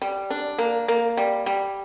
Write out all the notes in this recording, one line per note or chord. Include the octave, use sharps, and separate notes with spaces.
G3
D4
A#3
A#3
G3
G3